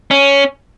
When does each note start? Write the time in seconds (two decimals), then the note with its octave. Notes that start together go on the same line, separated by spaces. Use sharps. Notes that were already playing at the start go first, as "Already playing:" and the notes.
0.11 C#4